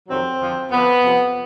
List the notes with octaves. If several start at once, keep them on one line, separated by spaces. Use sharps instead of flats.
F2 C3 D#3 F#3 C4
F2 D3 F3
F2 D3 F3 B3
F2 C3 F3